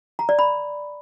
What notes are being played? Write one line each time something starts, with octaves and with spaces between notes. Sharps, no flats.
A#5
D5
B5